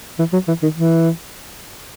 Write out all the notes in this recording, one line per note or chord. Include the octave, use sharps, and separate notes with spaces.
E3
F#3
E3
D#3
E3